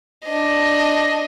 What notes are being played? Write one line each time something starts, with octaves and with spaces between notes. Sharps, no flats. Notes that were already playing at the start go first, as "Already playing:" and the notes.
D4 D#5